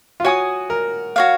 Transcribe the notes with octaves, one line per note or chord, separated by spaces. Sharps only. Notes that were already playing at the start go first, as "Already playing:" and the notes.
F4
F#4 C#5 G#5 D#6
A#4
F#4 C#5 F5